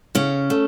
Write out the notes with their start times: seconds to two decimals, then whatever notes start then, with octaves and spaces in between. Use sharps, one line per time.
0.15 C#3 C#4
0.50 A3